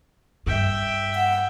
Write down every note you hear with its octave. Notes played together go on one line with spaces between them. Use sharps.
G2 E5 G5
F#5